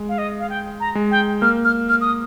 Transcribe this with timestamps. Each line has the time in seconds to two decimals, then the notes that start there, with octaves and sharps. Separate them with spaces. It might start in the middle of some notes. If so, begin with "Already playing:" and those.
Already playing: G#3
0.09 F5
0.18 D#5
0.39 F5
0.50 G5
0.80 A#5
0.95 G#3
1.11 G5
1.42 A#3 F6
1.65 F6
1.89 F6
2.01 D#6